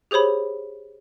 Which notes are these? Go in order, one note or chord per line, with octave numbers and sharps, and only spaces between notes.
G4 G#4 C5 C#5 B5